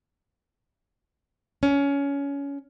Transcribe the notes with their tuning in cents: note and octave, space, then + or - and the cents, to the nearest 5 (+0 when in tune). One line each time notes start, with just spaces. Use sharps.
C#4 +20